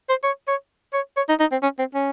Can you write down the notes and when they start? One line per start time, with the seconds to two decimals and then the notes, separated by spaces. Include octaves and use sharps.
0.09 C5
0.24 C#5
0.48 C#5
0.93 C#5
1.17 C#5
1.29 D#4
1.40 D#4
1.52 C4
1.63 C#4
1.79 C4
1.94 C#4